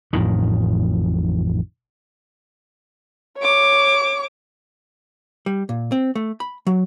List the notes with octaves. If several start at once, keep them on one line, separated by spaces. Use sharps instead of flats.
A1 F2 A2 D#3
C#5 D6
G3
A#2
C4
A3
B5
F#3